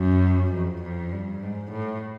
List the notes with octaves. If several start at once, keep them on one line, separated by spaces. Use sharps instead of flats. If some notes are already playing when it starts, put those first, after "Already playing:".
Already playing: F#2
F2
F2
G2
G#2
A2